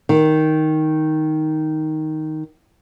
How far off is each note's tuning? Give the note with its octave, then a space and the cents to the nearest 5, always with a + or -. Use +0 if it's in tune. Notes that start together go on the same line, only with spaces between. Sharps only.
D#3 +5